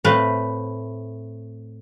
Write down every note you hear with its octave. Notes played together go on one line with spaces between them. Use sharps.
A2 A3 C4 B4 F5